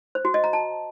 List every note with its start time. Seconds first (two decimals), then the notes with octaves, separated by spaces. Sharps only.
0.15 C5
0.25 F#4
0.34 D#5
0.44 A#5
0.53 A5